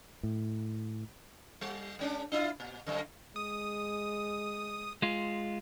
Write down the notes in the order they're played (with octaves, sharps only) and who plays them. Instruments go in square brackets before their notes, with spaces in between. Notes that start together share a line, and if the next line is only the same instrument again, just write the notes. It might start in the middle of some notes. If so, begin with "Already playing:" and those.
[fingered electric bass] A2
[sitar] G3
G#3 C#4 D4
D4 E4 F4
A#2
F#2 D3
[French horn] G#3 [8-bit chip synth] D#6
[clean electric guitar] G#3 F4